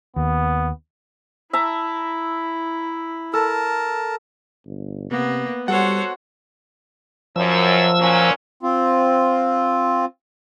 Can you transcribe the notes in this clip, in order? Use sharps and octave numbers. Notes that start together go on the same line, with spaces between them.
D#2 B3
E4 E5 A5 A#5
A4 A#4 A5
G1
C3 A#3 B3
G3 F#4 A4 C5 C#5 F#5
F#2 F3 E6
A#2 F#3 C#4
C4 F4